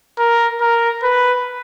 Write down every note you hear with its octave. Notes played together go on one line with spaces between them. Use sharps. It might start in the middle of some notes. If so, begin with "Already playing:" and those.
A#4
A#4
B4